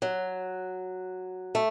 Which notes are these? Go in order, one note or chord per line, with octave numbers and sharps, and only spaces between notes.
F#3
A3